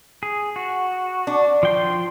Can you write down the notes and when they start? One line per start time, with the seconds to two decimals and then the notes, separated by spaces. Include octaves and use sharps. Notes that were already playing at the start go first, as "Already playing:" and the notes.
0.23 G#4
0.56 F#4
1.27 D4
1.63 F3 G5 C6